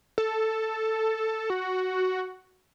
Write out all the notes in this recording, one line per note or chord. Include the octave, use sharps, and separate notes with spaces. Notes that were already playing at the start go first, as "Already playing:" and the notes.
A4
F#4